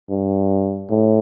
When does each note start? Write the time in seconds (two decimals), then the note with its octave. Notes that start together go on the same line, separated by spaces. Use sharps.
0.10 G2
0.90 A2